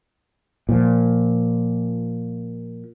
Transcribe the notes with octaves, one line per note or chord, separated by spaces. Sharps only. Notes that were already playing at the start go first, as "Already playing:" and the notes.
A#2 F3